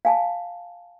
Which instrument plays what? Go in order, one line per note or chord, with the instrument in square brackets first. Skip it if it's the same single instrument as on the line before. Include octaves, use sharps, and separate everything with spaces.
[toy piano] F5 G#5 A5